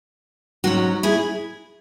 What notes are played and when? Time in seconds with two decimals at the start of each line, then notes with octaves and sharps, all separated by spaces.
0.64 G#2 F#3 C#4 F#4
1.03 E4 G#4